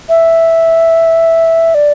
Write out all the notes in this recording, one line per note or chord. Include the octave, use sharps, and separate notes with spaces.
E5
D5